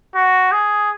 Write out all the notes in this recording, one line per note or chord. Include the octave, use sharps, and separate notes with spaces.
F#4
G#4